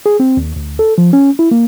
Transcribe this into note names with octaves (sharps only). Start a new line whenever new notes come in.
G#4
C4
D#2
D2
A4
F3
C#4
E4
A#3